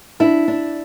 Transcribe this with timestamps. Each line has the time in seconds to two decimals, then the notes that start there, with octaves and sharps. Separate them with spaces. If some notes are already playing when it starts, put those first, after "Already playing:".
0.20 D4 E4
0.48 D4